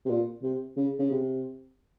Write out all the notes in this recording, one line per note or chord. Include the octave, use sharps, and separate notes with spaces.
C3
A#2
C3
C#3
C#3
C3